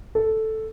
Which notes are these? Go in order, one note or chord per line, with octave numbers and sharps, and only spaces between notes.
A4